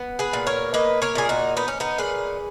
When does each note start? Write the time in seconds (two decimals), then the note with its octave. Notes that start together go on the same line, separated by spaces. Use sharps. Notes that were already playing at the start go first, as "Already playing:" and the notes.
Already playing: B3
0.19 G#4 B4
0.33 A#2
0.47 A#4 C#5
0.74 A#3 B4 D#5
1.02 A#4 C#5
1.15 A#2 G#4
1.29 D#4 F#4
1.57 B3 D#4
1.68 C#4
1.80 B3 D#4
1.98 A#2 G#4 B4